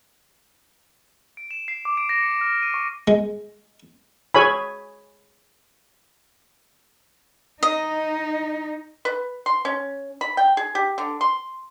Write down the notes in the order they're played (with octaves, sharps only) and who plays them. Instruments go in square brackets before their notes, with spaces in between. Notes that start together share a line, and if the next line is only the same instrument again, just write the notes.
[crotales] D7
E7
C7
D6
D7
A#6
C#7
F6
D#7
C#6
[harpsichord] G#3
[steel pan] G#4 C#5 G#5 B5
[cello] D#4 [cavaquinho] D#5
[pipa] B4
C6
C#4
B5
G5
G#4
G4
D3
C6